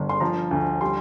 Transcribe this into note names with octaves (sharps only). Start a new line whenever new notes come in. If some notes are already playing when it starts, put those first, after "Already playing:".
Already playing: G1 D3
C6
F3 A#5
D2
G3 C6